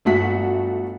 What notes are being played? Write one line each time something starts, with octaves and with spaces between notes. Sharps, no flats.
G1 A3 F#4 B6